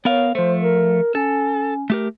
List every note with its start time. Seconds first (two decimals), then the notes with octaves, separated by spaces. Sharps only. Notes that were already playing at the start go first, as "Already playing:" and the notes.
0.05 B3 A#4 C#5 F5
0.35 F3 A3 C5
0.62 A#4
1.15 C#4 A4
1.90 A3 G4 A#4